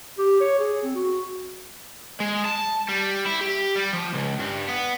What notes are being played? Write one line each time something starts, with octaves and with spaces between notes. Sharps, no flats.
G4
C#5
G#4
C4
F#4
G#3
A5
G3
E4
G4
G3
F3
C#2
G2
B3